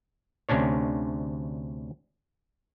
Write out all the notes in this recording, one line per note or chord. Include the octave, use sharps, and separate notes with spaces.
D2 C3 C#4 D4 C#5